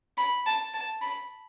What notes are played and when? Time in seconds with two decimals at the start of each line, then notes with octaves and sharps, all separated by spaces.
0.18 B5
0.46 A5
0.74 A5
1.02 B5